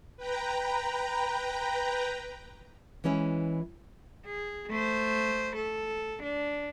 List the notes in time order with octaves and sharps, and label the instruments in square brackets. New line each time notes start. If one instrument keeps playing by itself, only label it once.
[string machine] B4 G5 A#5
[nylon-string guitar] E3 G#3 C#4 E4
[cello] G#4
A3 C5
A4
D4